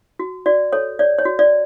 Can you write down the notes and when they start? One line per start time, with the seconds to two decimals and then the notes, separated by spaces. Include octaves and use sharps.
0.19 F#4
0.46 F#4 D5
0.72 A4 C#5
0.99 C#5 D5
1.19 C#5
1.25 F#4
1.39 D5